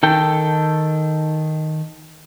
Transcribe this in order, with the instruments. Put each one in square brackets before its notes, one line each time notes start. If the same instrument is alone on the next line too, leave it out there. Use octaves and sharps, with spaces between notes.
[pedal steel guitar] D#3 A4 G5